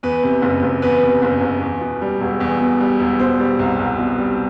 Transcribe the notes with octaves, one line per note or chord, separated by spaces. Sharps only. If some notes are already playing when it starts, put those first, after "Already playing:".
E2 B4
C3
F#1
F#1
E2 B4
C3
F#1
F#1
E2
B2
G3
E1
E2
B2
G3
E1
B2 C5
G3
C2
C2
B2
G3